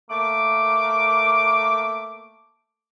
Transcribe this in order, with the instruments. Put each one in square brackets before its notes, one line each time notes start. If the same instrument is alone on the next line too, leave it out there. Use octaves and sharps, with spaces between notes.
[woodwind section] A3 A#3 D6